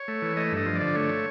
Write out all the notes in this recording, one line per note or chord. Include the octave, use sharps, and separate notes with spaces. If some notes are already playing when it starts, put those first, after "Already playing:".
Already playing: C#5
A3
E3
A3 D#5
G2
D#5
F3
D5
D3
A3 C#5